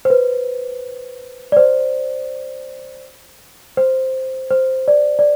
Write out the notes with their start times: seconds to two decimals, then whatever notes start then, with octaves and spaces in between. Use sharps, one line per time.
0.05 C5
0.10 B4
1.52 D5
1.57 C5
3.77 C5
4.51 C5
4.88 D5
5.19 D5